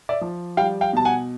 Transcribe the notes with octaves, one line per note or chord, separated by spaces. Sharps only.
D5 E5
F3
G3 F5 G5
F5 G5
B2 A5
F#5 G#5